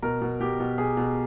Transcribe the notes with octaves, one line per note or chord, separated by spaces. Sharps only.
B2 A#4
B2
B2 G4
B2
B2 G#4
B2